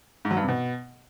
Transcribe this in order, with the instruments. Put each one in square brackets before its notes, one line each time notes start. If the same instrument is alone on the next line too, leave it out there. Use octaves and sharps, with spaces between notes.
[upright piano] G#2
F#3
G2
C3
B2